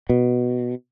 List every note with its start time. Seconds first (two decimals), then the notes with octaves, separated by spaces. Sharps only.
0.09 B2